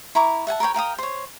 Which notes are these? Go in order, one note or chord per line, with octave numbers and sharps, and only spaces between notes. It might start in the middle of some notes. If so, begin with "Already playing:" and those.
E4 A#5 C#6 D6
E5 F#5 G#5 A5
A#4 B4 C#5 G5
A#4 F5 G5 D#6
C5 C#5